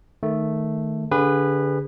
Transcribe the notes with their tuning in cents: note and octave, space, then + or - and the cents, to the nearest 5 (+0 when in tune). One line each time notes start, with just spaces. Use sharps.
D#3 +0 A3 +0
D3 -30 G#4 -35 B4 +0